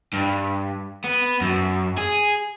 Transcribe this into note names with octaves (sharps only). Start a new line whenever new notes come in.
G2
B3
F#2
G#4